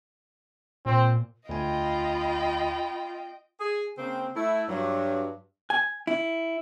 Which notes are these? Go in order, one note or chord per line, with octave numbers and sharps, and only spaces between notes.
A#2 C4
D2 F4 D#5 G5 G#5 B5
G#4
C#3 A#3 C4
A3 E4
G2 F#3
G#5
E4